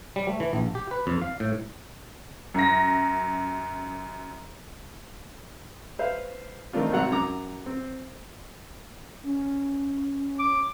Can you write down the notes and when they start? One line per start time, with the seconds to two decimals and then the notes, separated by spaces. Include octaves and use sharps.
0.16 G3
0.28 A3
0.40 E3
0.53 A#1
0.75 G4
0.91 B4
1.07 F2
1.22 F5
1.40 A2
2.54 F#2 A#6
5.99 B4 C5 E5 F5
6.73 D#3 A3 C4 D4 F4
6.92 G#1 C3 F#3 F#5 A#5
7.11 F#2 F#3 A#5 D6
7.66 C4
9.23 C#4
10.39 D6